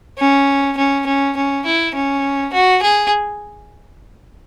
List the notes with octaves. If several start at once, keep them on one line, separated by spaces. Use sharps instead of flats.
C#4
C#4
C#4
C#4
E4
C#4
F#4
G#4